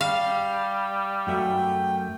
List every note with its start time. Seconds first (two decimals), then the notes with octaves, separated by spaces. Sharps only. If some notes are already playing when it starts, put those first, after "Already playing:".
0.01 G3 F5
1.27 F#2 A3 E5 G5